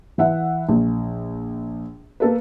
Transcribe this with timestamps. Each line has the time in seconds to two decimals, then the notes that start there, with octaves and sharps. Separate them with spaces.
0.18 E3 E5 F#5
0.69 A#1
2.20 A#3 A4 B4